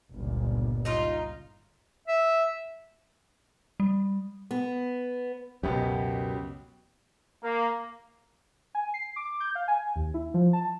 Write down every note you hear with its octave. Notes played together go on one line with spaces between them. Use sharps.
G1 C#2 A#2
D#4 F4
E5
G3
B3
C#2 F#2 B2 B3 G4
A#3
G#5
C7
D6
G6
F5
G#5
D#2
E4
F3
A5